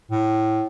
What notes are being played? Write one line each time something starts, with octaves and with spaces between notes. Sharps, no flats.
A2